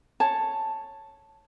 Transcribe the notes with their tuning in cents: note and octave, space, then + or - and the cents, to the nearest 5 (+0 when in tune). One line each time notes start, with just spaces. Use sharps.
C#5 -5 A5 +5